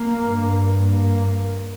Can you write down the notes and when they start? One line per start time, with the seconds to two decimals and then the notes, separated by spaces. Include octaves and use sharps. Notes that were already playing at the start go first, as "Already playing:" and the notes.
Already playing: A#3
0.23 G2
0.86 A#3